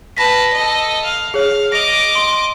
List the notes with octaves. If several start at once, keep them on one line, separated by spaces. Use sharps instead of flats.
B4 A5 B5 A#6 B6
A4 D#5
F5
G#4 C#5 F5
D#5 D6 A#6 F7
C6